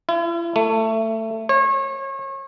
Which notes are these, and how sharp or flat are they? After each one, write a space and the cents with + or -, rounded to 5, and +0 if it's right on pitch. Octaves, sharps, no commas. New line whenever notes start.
E4 +45
A3 +20
C#5 -35